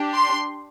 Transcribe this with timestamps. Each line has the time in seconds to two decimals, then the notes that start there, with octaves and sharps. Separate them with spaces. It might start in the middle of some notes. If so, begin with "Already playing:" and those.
Already playing: D4 G4
0.14 C6